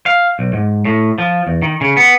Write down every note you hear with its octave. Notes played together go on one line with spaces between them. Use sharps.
F5
B1
G#2
A2
F3
E2
D#3
C#3
B3